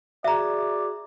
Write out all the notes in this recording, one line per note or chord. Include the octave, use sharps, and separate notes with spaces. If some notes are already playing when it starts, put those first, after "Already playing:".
F#4 G#4 D5 E5 A#5